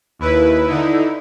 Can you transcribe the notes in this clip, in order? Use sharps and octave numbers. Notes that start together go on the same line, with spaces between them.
D#2 E4 B4
D3 D#4 E4